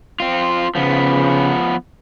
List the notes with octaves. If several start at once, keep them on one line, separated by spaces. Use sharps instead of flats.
C4 F4
C#3 F3 B3